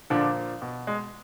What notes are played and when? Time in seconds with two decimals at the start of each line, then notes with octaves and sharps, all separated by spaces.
0.10 A#2 D3 F3 D4
0.62 B2
0.87 G#3